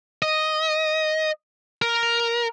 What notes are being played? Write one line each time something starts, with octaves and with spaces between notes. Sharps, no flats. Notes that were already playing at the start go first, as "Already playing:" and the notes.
D#5
A#4